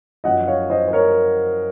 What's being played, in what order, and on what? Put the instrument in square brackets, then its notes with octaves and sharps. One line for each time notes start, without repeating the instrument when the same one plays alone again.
[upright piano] F#2 F3 D#5 F#5
C#5 F5
C5 D#5
C5
A#4 C#5